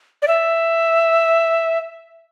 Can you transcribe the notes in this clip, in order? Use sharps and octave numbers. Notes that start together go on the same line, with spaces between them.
D5
E5